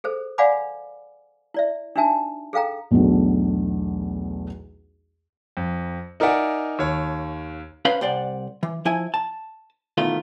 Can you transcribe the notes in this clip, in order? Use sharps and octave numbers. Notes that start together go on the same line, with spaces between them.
G#4 A4 C5
D5 F5 F#5 G#5 B5 D6
E4 D5 E5
D4 D#4 F#4 E5 G#5 A5
G#4 A4 F5 G5 A#5
B1 E2 F#3 A3 D4
F2
D#4 A#4 D5 E5 F#5 G#5
D#2 C#5
C#4 B4 C5 F5
C2 C5 D5 F#5
E3
F3 E4 G#5
A5
B2 D#3 E3 A3 F4